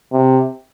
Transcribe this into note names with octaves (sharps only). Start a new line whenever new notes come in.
C3